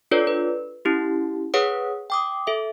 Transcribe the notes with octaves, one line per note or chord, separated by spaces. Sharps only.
D4 F4 A4 B4 C#5 D5
B4
C#4 E4 G4
G#4 B4 C#5 F#5 D#6
G5 D6 D#6
A4 E5